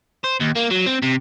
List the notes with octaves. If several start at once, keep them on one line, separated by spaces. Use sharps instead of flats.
C5
D#2
A#3
F#3
C4
C3